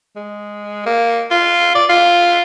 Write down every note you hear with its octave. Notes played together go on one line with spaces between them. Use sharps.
G#3
A#3
F4
D5
F4